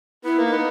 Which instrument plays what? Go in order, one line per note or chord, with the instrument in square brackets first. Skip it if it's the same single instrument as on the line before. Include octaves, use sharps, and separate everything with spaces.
[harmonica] B3 [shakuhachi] E4
[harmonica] A#3
[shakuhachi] D#4
[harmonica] B3